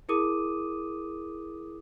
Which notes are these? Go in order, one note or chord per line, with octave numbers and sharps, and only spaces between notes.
E4 G#4 A#4 D6 D#6 D#7